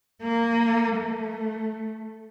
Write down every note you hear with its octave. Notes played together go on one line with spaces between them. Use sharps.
A#3
A3